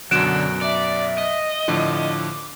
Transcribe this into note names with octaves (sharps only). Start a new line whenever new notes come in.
F#2 B2 D3 F#3 F#6 D7 E7
D5 E5
D#5
A2 D3 F3 D6